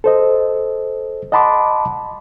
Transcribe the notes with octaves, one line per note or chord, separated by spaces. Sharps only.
A4 C5 D#5
D#5 F#5 A5 B5 C6 D6